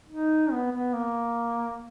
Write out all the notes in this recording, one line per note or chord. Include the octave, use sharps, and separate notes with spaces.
D#4
B3
B3
A#3